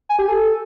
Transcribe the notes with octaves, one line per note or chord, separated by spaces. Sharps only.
G#5
G4
A4